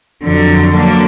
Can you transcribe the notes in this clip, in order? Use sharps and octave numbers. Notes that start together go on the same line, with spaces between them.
F2 D3 F#3
D3 F#3 A#3 D4